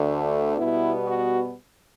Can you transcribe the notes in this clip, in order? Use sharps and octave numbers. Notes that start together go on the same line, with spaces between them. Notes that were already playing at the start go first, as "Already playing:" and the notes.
Already playing: D2 D3 A3
B2 G3 B3 E4
F#4